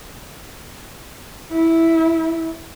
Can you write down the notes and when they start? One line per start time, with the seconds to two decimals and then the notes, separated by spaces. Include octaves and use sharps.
1.52 E4